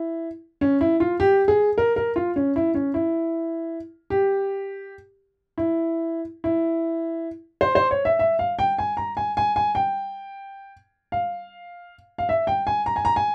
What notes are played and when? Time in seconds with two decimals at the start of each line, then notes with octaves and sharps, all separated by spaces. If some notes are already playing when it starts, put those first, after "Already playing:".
Already playing: E4
0.61 C#4
0.81 E4
1.00 F4
1.20 G4
1.48 G#4
1.78 A#4
1.96 A#4
2.16 F4
2.36 C#4
2.56 E4
2.75 C#4
2.94 E4
4.10 G4
5.58 E4
6.44 E4
7.61 C5
7.75 C5
7.91 C#5
8.05 E5
8.19 E5
8.39 F5
8.59 G5
8.78 G#5
8.97 A#5
9.17 G#5
9.37 G#5
9.56 G#5
9.75 G5
11.12 F5
12.18 F5
12.29 E5
12.47 G5
12.67 G#5
12.86 A#5
12.96 G#5
13.05 A#5
13.16 G#5